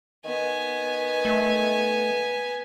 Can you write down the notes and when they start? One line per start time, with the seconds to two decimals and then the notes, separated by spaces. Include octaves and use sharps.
0.25 D#3 B3 G#5
1.25 A3